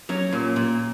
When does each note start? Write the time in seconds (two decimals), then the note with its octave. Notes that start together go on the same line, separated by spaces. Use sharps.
0.09 F#3 C#4
0.33 A#2
0.56 A#2